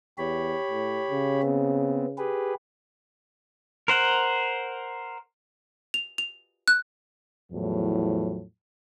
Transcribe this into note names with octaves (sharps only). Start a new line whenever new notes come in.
E2 G4 C#5 B5
A2
C#3
B3 C4
G4 G#4 B4
A#4 C5 F#5
F7
F7
F#6
E2 A2 F3 F#3